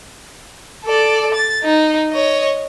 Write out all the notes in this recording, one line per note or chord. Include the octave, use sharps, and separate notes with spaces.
A4 D5
A6
D#4
C#5 D#5